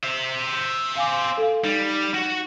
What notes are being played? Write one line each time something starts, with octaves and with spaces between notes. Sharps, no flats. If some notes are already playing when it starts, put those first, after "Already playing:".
C5 E5
F5 G#5 D6
A4 F5
G3 D#4
F#4